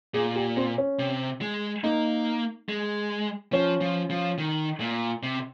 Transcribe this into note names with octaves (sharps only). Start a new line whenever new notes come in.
A#2 G#4
G4
C4
C#4
C3
G#3
A#3 D#4
G#3
F3 C#4
F3
F3
D#3
A#2
C3